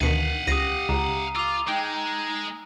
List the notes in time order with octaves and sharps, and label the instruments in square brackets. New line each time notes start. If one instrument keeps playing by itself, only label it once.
[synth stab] D2 B2 D#3 [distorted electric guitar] F5 F#5 [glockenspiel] B6 C7 D#7
[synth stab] C#2 A#6 [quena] G4 [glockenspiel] D#6 C7 D#7
[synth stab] C#2 [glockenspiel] A#5
[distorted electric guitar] F4 [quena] D6 [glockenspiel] E6 F7
[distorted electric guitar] G#3 [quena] D#4 [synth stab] G5